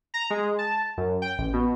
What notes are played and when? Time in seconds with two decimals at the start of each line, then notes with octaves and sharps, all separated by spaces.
0.14 A#5
0.30 G#3
0.59 A5
0.97 F#2
1.22 G5
1.38 A1
1.53 B2